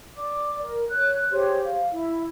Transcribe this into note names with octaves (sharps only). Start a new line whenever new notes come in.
D5 D6
A#4
C#5 F#6
G4 G#4 C5 C#5
F5
E4